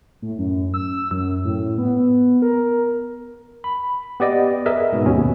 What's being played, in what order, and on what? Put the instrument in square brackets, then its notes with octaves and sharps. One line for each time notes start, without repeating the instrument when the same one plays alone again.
[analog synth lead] A2
F#2
E6
F#2
A2
B3
A#4
[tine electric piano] B5
B3 G4 D5 D#5
G#4 A#4 B4 D#5 E5
G#2 B2
D#2 B2 C#4